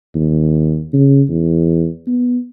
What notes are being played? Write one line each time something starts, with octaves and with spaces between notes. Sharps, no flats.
D#2
C#3
E2
B3